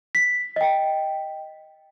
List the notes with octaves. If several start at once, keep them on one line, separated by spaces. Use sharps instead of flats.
B6
D#5 G5